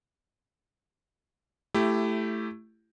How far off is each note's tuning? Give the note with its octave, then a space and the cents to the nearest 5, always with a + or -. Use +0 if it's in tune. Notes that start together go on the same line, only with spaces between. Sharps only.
A3 +0 E4 +20 G4 +0